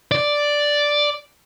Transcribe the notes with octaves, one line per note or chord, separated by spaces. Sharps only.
D5